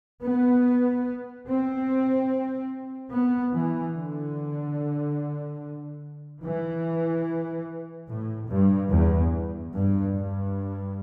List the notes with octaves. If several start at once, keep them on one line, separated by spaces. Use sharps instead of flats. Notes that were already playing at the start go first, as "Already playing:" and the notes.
B3
C4
B3
E3
D3
E3
A2
G2
E2
G2
G2